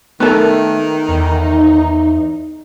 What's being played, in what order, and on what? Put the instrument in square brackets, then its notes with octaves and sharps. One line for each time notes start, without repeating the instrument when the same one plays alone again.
[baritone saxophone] D#3 [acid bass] A3 [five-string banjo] B3 A4 A#4
[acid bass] E2 [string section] D#4